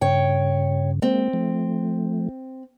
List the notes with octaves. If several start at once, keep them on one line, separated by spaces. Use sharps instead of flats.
G2 C#3 C#5 G5
G#3 A#3 C4
F3 A3